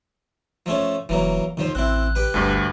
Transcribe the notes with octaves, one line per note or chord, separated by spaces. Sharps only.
F3 A3 C#4
F1 E3 F#3 A#3
D#2 D#3 F3 C5
A1 C4 E4 F#6
G4 B4
G1 D2 G2 G3